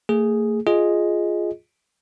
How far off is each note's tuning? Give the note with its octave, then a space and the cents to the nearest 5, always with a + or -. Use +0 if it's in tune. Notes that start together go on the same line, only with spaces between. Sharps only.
A3 +45 G#4 +0
F4 +0 G#4 +0 D#5 +0